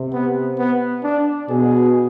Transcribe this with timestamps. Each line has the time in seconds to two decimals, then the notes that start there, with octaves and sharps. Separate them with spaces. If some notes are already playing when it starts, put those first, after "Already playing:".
Already playing: C3
0.13 B3
0.59 B3
1.04 D4
1.49 B2 G#4